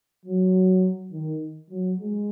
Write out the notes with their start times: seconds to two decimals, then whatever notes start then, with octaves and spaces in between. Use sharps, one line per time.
0.25 F#3
1.13 D#3
1.70 F#3
1.99 G#3